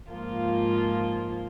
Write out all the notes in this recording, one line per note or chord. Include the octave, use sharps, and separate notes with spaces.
G#2 F3 A#3 F4